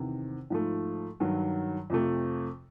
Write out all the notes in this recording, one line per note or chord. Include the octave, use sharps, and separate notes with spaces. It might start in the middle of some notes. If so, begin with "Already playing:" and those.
Already playing: E2 C3 D#3
G#2 F3 A3
G2 D#3 F#3
F2 C3 F3 A3